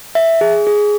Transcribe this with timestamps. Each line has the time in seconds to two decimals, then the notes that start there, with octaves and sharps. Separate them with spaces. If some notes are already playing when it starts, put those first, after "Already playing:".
0.15 E5
0.41 G#4
0.67 G#4